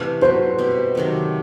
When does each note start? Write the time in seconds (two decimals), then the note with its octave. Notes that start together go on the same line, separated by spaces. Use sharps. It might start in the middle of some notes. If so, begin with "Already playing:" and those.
Already playing: C3 E3 A3
0.21 F#3 C4 F#4 B4 C5
0.58 B2 G3 C4
0.95 C3 D#3 F#3 A3